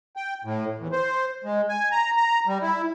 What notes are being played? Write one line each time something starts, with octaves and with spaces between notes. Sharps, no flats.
G5
A2
E2
C5
G#3
G#5
A#5
A#5
G3
E4